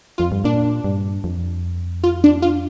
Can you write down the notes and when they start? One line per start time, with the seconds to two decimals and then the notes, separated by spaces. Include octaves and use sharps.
0.18 F2 F4
0.32 G2
0.44 A#2 D4
0.84 G2
1.24 F2
2.04 F4
2.24 D4
2.42 F4